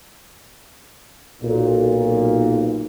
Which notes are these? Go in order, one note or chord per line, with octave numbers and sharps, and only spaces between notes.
B1 A#2